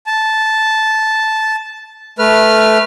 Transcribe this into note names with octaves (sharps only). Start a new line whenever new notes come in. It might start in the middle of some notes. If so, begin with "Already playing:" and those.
A5
A3 B4 F6